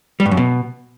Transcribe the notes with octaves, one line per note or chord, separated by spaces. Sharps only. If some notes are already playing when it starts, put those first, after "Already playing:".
G3
G2
F#2
B2